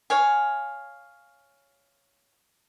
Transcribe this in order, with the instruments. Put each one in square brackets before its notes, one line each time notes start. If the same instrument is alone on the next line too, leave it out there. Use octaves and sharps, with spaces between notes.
[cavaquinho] C#5 F5 G#5